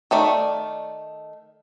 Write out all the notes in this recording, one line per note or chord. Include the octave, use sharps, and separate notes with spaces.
D#3 A3 D5